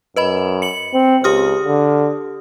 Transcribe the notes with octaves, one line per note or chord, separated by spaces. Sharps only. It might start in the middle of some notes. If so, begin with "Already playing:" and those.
F#2 B4 D#5 B5
C#7 F#7
C4
C#2 G4 D#6 F6
D3